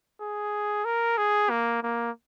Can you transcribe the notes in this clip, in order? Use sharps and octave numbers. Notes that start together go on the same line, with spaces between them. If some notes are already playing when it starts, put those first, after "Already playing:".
G#4
A#4
G#4
A#3
A#3